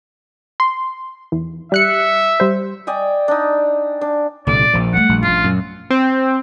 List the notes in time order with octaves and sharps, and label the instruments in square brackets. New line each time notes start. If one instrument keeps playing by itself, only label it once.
[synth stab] C6
E2
[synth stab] G3 F#6 C#7 [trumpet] E5
[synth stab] G3 C5
[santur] D5 D#5 G5 G#5
D4 D#4
D4
[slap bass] C2 D3 [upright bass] A#2 B3 [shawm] D5
[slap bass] A#1 F3
[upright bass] G3 A3 [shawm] F#5
[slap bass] A#1
[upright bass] A#2 C#4 [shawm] F4
[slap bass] F#2
[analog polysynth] C4